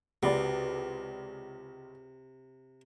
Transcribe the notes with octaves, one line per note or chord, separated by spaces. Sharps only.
C#2 C3 F#4 B4 D5